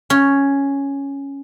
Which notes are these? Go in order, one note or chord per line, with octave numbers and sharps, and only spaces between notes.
C#4